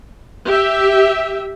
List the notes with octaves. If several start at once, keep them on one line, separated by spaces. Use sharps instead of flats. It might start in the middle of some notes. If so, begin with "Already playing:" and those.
G4 E5